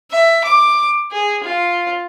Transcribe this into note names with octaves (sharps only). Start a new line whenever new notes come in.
E5
D6
G#4
F4